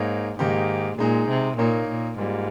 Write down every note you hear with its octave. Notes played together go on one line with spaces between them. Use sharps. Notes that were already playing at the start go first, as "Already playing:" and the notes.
Already playing: G#2 A#3 D#4 A#4 C#5
G#2 D#3 A#3 D#4 G4
A#2 G#3 D#4 G#4
C3
A#2 A#3 D#4 A#4 C#5
A#2
G#2 G3 A#3 F4